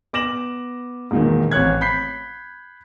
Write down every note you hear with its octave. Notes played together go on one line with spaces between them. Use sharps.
B3 D6 A#6 E7 F#7
E1 A#2 D#3
A1 C4 C#5 F#6 G#6
B5 G6 B6 C7